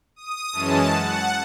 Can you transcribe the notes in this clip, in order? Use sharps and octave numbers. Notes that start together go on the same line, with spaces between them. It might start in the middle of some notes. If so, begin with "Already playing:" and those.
D#6
F#2 E3 G#3 C#4 A5
F#5